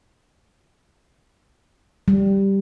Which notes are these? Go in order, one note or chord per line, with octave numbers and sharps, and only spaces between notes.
G3